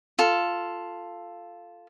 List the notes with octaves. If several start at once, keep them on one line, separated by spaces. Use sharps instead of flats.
F4 A4